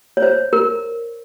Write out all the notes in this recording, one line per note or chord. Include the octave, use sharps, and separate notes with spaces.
C#5
C5
A#4